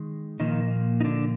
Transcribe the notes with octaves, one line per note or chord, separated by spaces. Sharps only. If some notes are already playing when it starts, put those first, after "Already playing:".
Already playing: D#3 G#3
A#2 D#3 F3 A#3 D#4
D#4
D3 D4